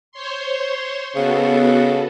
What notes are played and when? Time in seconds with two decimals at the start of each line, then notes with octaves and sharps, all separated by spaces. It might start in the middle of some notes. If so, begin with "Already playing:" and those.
0.12 C5 C#5 C6
1.16 C#3 B3 F#4 A4